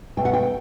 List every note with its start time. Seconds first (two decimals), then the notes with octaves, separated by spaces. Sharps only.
0.17 B2 A3 G5
0.25 F#5
0.34 G5